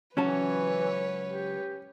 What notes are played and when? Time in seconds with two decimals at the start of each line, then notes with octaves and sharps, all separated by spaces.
0.17 C#2 E3 F#3 C#4 B4 C#5 A5
1.26 G4